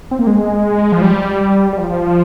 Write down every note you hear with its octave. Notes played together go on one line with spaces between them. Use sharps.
C4
A#3
G#3
F3
G3
G3
F3